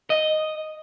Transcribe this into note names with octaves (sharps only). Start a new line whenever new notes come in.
D#5